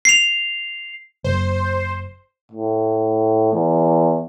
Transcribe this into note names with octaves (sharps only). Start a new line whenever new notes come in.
C7 F7
F#1 C5
A2
E2